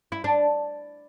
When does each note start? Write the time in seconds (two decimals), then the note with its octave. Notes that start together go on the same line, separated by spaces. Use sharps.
0.12 E4
0.24 D4